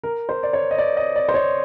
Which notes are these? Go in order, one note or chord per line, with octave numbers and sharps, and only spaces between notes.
A#4
C5
D5
C#5
D#5
D5
D#5
D5
C5
C#5